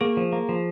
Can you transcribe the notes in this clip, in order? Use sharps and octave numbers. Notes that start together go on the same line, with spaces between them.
A#3 G#4
F3
A#3
F3